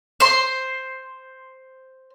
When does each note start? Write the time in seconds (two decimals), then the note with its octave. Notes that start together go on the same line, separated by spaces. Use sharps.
0.20 C5 C6